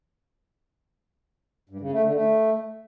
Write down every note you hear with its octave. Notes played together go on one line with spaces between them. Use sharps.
G2
C#3
A3
D3
A3